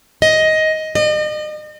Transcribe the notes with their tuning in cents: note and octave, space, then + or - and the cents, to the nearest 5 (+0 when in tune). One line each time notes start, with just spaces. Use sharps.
D#5 +10
D#5 -40